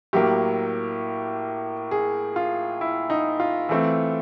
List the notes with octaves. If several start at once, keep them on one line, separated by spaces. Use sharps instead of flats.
A2 F#3 A#3 G4
G#4
F4
E4
D#4
F4
E3 A3 C4